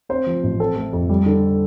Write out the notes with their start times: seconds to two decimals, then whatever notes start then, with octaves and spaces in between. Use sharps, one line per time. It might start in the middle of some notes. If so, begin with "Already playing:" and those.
0.09 C4 C5
0.26 F3
0.44 A1
0.60 C4 A4
0.76 A3
0.93 F2
1.09 G3
1.26 D3